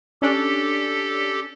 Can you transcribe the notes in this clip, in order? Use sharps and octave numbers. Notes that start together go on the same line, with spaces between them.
C#4 D4 G4 A4